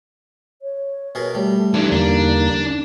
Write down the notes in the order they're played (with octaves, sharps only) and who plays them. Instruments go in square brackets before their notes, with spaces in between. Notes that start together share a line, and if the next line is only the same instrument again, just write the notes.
[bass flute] C#5
[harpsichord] B2 G#4 A#4
[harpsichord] G3 [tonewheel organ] A3
[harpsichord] G2 [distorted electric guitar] E3 D4 [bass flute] D#4
[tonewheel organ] E2 D3 A#3 [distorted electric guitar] D4